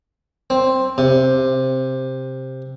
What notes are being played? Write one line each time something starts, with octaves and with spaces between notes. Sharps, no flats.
C4
C3